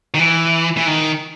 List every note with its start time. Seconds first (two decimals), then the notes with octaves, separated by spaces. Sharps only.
0.14 D#3
0.19 E3
0.77 E3
0.87 D#3